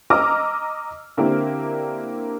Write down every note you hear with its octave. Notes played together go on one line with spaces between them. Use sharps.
D#5 A#5 D6 E6 F6
D3 A#3 C4 E4 G4 A#4